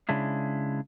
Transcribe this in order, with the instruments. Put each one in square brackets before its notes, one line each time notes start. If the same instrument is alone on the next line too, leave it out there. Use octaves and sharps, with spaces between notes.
[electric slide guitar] C#3 G#3 D4 E4